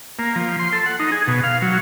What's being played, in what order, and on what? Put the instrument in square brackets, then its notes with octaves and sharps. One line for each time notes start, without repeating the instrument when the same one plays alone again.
[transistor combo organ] A#3
F3
C6
A4
F#5
D#4
G#4
B2
F5
F#3